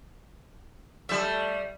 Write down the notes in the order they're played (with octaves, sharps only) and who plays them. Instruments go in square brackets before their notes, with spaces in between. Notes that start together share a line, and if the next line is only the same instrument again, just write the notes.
[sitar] G3 E5 [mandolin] A3 G6